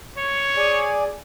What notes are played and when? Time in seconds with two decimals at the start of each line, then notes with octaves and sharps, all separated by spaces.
0.17 C#5
0.57 G#4 D5 G#5